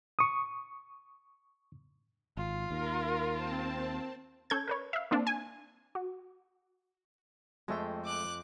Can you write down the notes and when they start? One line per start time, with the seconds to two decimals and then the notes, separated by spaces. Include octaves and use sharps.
0.19 C#6 D#6
2.37 G#1 F4
2.71 D#2 A#4
3.33 C4 A5
4.50 C#4 A4 G6 G#6
4.68 A#4 B4 C#5
4.93 E5 F5
5.11 A#3 C4 D4
5.27 G#5
5.95 F#4
7.68 F2 G#3 A3 G5
8.05 D6 F#6